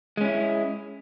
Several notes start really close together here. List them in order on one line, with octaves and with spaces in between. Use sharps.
G#3 C#4 E4